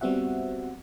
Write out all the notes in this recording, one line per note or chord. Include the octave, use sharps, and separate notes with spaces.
G3 B3 C4 F#4 E5 F#5